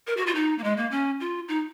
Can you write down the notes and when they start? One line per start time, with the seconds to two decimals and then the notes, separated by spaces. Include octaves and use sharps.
0.07 A#4
0.17 F#4
0.27 F4
0.35 D#4
0.59 A#3
0.64 G#3
0.77 A#3
0.91 C#4
1.20 F4
1.48 D#4